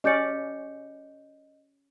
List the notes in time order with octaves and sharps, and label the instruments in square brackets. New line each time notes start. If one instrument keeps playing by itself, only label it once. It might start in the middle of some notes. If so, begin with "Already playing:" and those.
[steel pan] C#4 G4 D5 [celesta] D#5 G6 C#7